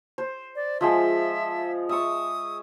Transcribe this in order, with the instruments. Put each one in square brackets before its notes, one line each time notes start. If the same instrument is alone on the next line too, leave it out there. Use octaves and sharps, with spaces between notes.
[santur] C5
[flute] D5
[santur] F3 G#3 G#4 [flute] E5
[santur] E5 C#6 [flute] D#6